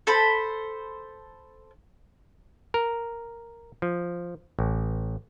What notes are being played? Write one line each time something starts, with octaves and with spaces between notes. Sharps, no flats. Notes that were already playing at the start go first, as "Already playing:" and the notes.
A4 C5 B5
A#4
F3
A1